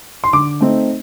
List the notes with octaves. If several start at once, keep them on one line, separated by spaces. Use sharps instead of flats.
C6
D3 D6
A3 C4 D#4